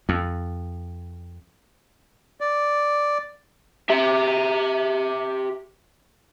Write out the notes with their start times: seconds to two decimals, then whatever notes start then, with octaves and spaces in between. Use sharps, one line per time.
0.09 F2
2.41 D5
3.90 G4 E5